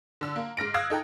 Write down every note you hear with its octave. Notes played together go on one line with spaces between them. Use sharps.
D3 E6
A#3
G#2 F6 A#6 D7
F5 D#6 E6 F#6 G#6
D#4 A4 G5 A#5